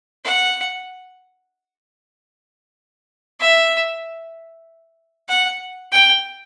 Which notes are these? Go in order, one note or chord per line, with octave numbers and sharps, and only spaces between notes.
F#5
E5
F#5
G5